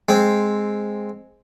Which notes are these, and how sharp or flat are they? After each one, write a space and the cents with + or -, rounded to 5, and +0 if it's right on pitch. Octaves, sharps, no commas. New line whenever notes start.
G#3 +0 C4 +0